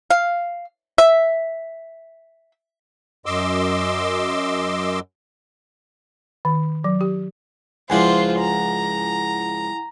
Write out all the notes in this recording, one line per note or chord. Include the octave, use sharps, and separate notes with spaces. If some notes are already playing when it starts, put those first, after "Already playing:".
F5
E5
F#2 D#5 C6 D6 E6
D#3
F#3
G4
C#2 F3 E4 F4 C5 D5 F#5 G#5
A#5